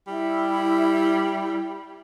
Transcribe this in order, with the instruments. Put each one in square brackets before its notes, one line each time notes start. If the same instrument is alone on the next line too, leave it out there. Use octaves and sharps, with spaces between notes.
[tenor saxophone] G3 [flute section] E4